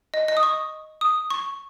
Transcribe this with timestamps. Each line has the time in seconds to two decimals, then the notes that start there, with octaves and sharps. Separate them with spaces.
0.14 D#5
0.28 D#5
0.37 D#6
0.43 C#6
1.01 D#6
1.30 C#6